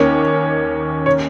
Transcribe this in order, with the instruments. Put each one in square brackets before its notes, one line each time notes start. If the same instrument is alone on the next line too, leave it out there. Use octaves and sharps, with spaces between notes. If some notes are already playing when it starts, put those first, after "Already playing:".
Already playing: [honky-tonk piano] D#2 D#3 A#3 C#4 [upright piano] C#5
[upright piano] C#5